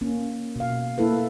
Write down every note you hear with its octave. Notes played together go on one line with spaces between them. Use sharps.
A#3 C#4
B2 F5
A#3 E4 A4 B4